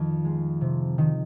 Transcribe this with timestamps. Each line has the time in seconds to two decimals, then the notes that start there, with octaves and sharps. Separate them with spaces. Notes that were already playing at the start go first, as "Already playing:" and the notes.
Already playing: F2 D#3
0.25 G#3
0.61 C3
0.98 D#3